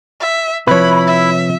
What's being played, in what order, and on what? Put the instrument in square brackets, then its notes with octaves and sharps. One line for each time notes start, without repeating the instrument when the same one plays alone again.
[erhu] E5
[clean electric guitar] C3 F3 [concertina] E4 [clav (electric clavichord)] B4 C#5 [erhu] B5
[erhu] E5